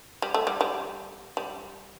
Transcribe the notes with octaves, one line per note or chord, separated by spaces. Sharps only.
G3
A3
G3
G3
G3